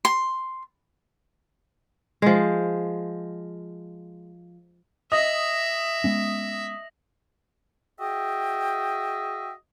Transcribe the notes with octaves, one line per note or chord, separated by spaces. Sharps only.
C6
F3 G#3
D#5 E5 D#6 A#6 F#7
G#3 B3 C#4
F#4 G#4 D#5 E5 G5